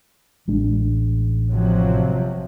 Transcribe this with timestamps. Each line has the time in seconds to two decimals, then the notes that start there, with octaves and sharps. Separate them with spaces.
0.48 A1 G#3 D4
1.51 C3 F3 F#3